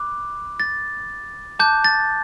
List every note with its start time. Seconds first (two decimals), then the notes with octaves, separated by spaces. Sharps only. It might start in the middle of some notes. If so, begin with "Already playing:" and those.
Already playing: B5 D6 F#6
0.60 A6
1.59 A5 D6 F#6 G6
1.84 A6